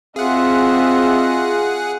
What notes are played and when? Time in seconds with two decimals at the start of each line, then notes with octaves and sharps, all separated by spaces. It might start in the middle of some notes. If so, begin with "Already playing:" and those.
0.16 C4 F4 F#4 G#4 D#5 E5 F#5